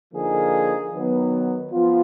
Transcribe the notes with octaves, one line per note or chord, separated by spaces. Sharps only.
D3 F3 A#3 D#4 G#4
D#3 F#3 B3 D#4
F3 B3 F4